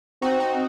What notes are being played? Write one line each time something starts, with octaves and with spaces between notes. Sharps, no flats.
C4 D#4 F#4
D#4 F#4